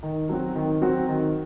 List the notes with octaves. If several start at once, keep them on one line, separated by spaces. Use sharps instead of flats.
D#3
F#3 C4 F#4
D#3
F#3 C4 F#4
D#3